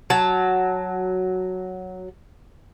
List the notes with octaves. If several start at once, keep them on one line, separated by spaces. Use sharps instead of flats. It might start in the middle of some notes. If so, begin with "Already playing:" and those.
F#3 A5